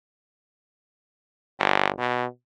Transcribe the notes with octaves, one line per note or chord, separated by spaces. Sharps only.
G1
B2